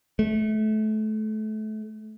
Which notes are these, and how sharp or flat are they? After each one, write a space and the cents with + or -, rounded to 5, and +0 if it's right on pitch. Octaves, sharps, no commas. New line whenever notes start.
A3 -30